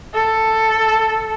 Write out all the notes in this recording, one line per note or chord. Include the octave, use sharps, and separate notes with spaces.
A4